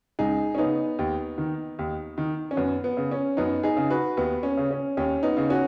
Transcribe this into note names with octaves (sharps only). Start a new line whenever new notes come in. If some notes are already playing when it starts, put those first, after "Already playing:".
C#2 D#4 G#4
C#4
C#3 B3 D#4
D#2
D#3
D#2
D#3
C#4
F#2 B3
B3
C#3
C#4
F#2 B3 D#4
D#4 G#4
C#3
F#4 B4
D#2 B3
C#4
C#3
C#4
D#2 C#4
B3 D#4
C#3
C#4 F#4